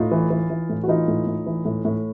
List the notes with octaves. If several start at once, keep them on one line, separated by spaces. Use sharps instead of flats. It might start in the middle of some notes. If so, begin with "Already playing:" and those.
Already playing: A2 D#4 F4
E3
E3
E3
A2
F#4
E3 D#4 F4
A2
A2
E3
A2
A2